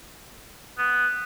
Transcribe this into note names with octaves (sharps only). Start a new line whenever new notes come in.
B3